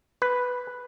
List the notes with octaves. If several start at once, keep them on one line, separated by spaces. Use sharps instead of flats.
B4